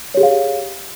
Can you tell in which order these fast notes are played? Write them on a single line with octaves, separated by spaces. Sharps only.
C#5 G4 G#4 F5